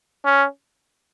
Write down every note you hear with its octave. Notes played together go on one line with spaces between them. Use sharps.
C#4